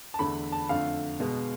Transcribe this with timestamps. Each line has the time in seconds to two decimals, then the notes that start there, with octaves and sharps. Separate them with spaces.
0.14 A5
0.19 E2 D3 A3 B5
0.52 A5
0.69 F2 D3 A3 F5
1.20 B2 G#3 B3